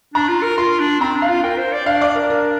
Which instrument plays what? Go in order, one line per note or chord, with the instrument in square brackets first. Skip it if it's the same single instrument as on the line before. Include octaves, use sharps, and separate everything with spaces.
[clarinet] D4 [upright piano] A#5
[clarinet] F4
A#4
[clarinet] F4 [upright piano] C6
[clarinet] D4
[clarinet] C4 [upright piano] A#5
[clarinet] D4
[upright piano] F5
[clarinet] F4
[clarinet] A#4 [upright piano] G5
[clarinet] C5
D5
[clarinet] D4 [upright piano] F5
[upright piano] D5
A#4
A#4